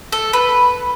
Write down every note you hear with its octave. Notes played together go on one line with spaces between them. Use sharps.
A4
B4